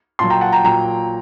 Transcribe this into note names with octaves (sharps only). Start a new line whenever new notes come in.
A#2 F#3 A5 C6
G5 A#5
F#5 A5
G5 A#5
A#2 F#3 G5 A#5